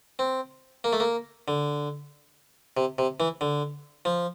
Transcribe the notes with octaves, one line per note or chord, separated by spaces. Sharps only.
C4
A#3
A3
A#3
D3
C3
C3
E3
D3
F3